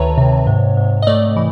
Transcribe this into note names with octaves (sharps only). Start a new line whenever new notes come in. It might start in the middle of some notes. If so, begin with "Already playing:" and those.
Already playing: D2 D#3 B4 C#5 E5 A5 A#5
C3
G#2
G#2
D#5
A3 D5
E3